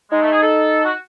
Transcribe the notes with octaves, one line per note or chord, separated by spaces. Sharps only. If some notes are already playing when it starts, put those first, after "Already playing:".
G#3 D#4
A3
G#4
A4
F#4